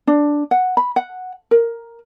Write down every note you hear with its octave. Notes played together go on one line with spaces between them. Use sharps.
D4
F#5
B5
F#5
A#4